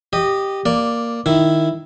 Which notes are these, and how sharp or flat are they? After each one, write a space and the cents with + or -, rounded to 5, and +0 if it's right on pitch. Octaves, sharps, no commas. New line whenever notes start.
G4 +0 D#5 -15
A#3 +0 D5 +0
D#3 +0 E4 +0